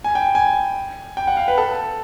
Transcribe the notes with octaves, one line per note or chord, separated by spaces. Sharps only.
G#5
G5
G#5
G5
F#5
F5
B4
A4